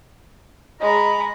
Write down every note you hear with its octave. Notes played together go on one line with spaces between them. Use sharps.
G#3 D#5 A#5 B5